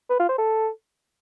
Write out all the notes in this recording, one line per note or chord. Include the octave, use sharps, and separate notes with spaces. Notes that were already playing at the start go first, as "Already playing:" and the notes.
B4
F4
C5
A4